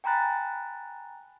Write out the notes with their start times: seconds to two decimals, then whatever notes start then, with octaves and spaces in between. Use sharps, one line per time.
0.04 G5 G#5 A#5 B5 F#6 A6